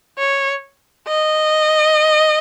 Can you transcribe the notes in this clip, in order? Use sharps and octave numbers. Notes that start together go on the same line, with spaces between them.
C#5
D#5